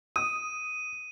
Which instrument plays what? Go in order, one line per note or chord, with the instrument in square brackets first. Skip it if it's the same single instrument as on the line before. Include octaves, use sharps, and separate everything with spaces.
[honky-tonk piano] D#6 [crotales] D#7